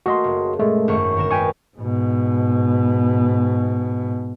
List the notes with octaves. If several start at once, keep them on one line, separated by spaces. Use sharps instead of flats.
A3 A#3 F#4 D#5 C6
F#1
A#2 G#3 A3
G#1 F#2 C#6
G1 B3 A#4 E7
D#4 A#4 B4 G5 G#5 C#6
G#2 B2